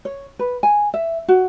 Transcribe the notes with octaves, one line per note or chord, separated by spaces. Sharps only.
C#5
B4
G#5
E5
F#4